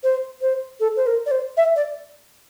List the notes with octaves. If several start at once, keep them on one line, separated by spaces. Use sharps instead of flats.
C5
C5
A4
C5
A#4
D5
C5
E5
D5